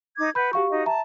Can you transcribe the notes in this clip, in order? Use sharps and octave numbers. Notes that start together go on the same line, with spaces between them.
D#4 D6 G#6
B4 F#5 B5 G6
F#4 G4 F5 C#6
D#4 F#4 D#5
E5 A5 A#5